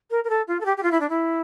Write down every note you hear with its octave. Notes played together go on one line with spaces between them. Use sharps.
A#4
A#4
A4
F4
A4
G4
G4
F4
E4
D4
E4